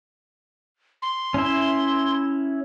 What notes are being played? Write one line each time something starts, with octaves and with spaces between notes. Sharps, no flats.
C6
C#4 E4 E5